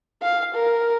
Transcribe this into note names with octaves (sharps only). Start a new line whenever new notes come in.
F5
A#4